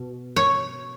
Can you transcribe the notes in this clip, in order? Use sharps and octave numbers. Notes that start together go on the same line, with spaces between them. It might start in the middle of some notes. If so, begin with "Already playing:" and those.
Already playing: B2
C#5